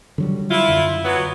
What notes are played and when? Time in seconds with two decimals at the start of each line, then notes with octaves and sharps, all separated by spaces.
0.18 D3 F#3 G3
0.51 E4 F4
0.68 F#2 D3
1.05 F#3 B3